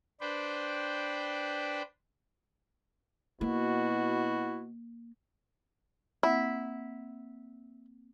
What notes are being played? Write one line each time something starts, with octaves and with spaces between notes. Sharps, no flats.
D4 B4 C5 G5
B2 A#3 E4 F#4
A#3 C4 E4 F#5